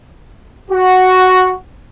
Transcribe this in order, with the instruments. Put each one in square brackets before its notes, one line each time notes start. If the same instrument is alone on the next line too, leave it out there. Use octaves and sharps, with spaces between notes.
[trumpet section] F#4